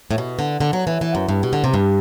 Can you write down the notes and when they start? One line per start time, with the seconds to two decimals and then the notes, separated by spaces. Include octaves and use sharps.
0.11 A2
0.18 B2
0.39 D3
0.60 D3
0.73 F#3
0.87 E3
1.01 E3
1.15 F#2
1.29 G2
1.43 B2
1.53 D3
1.64 C3
1.74 G2